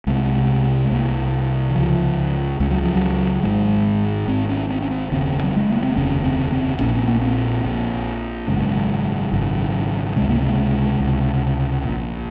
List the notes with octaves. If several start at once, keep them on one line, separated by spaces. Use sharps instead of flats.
C2 C3 G#3
G#3
C2 C3 A#3
D#3
C#2 C#3 F3
C#2 C#3 G#3
F#3
F3
F#3
G#1 G#2 G#3
G#1 G#2 C4
C#4
C4
C#4
C4
F1 D#2 C#3 C4
F#3
G#3
A#3
C4
F1 D#2 C#3 C#4
C4
C4
A#1 A#2 C#4
C4
A#3
C4
A#1 A#2
G#1 F#2 C#3 G#3
G#1 F#2 C#3
C#2 C3 G#3
A#3
G#3
C#2 C3
A#1 A#2